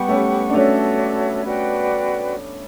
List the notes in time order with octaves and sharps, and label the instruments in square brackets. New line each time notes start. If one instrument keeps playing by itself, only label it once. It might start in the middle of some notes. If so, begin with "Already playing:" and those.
Already playing: [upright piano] G3 B3 [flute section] G4 B4 F#5 C#6
[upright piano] A3 C#4
D4
[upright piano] A3 C#4 [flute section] F#4 A4 C#5 E5
[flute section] F#4 B4 D5 G5